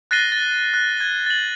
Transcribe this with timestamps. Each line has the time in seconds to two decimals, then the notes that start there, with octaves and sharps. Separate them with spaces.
0.11 F#6 A6 A#6 C7 D#7 G7
0.32 A6
0.74 F#6
0.97 G#6 G7
1.26 A6 F#7